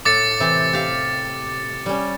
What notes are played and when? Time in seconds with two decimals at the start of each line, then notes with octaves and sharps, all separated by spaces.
0.05 A2 D6 A6 C#7
0.40 C3 E3 C4
0.73 G4 F5
1.86 G3 C#4